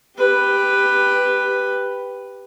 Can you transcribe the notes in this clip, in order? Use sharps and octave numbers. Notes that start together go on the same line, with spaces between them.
G4 B4